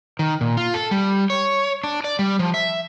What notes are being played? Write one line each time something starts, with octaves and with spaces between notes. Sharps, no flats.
D#3
A#2
F4
A4
G3
C#5
D4
D5
G3
F3
E5